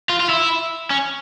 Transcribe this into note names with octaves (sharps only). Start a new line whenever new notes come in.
F4
F4
E4
C#4